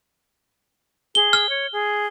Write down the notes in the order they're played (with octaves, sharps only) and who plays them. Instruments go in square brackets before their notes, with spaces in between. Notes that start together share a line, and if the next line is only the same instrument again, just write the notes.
[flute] G#4 [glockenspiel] G7
[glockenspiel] F6
[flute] C#5
G#4